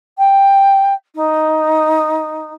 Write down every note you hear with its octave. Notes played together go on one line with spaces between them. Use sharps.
G5
D#4